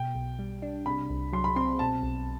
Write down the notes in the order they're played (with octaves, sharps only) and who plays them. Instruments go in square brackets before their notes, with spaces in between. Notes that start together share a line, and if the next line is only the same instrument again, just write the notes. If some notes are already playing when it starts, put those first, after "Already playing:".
Already playing: [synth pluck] B2 [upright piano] G5
[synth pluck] B1
G3
D4
[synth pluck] C3 [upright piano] B5
[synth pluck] C2
[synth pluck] F#3 [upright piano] C6
[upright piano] B5
[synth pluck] C4 [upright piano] C6
[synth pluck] B2 [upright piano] A5
[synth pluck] B1